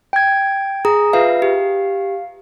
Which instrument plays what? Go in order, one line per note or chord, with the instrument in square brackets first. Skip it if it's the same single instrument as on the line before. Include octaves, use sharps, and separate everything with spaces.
[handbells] G5 G#6
[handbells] G#4 [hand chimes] A#5
[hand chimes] F4 B4 E5 [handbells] F5
[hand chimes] G4